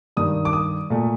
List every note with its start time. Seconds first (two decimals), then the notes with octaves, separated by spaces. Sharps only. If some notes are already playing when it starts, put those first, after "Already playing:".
0.17 G2 D#3 G3 D#6
0.45 D6
0.53 D#6
0.90 A#2 A3